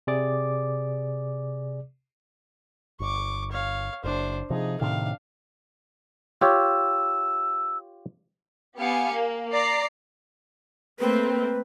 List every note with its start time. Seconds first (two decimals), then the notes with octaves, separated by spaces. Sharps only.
0.07 C3 G#4 D5 D6
3.00 G1 C#6 D6
3.52 C#5 F5
4.04 F#1 D4 C5
4.50 C3 F3 D#4 G#4
4.81 A2 C3 D#3 D4 F5
6.41 F4 G4 C#5 E6
8.78 B3 G4 F5 G#5 C#7
9.13 A#3
9.52 D5 A#5 C7
11.00 A3 A#3 C4 B4